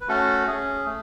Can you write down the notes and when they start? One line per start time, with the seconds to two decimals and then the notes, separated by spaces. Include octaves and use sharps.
0.01 B4
0.08 A3 C#4 F#4 A4
0.47 C#4 G#4
0.86 A3